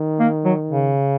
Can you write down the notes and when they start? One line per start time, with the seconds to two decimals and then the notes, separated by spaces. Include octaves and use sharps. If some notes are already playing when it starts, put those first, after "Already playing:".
Already playing: D#3
0.20 A#3
0.45 F#3
0.71 C#3